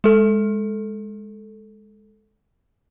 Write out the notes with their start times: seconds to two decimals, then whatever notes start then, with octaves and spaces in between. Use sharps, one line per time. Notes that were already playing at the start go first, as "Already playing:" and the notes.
0.04 G#3 A4